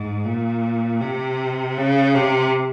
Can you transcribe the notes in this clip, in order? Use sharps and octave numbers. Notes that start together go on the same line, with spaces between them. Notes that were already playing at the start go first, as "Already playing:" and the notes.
Already playing: G#2
A#2
C3
C#3
C3